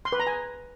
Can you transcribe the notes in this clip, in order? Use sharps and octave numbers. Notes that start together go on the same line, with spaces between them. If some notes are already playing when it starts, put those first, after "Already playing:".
C6
B4
A#5
G#5